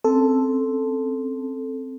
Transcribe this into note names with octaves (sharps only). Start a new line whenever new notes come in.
C4 C#4 A4